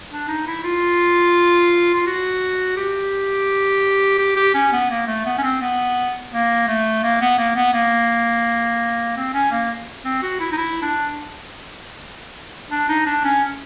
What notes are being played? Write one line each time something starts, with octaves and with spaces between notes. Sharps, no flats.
D4
D#4
E4
F4
F4
F#4
G4
G4
G4
C#4
B3
A#3
A3
B3
C#4
C4
B3
A#3
A3
A#3
B3
A#3
B3
A#3
C4
C#4
A#3
C4
F#4
E4
D#4
E4
D4
D4
D#4
D4
C#4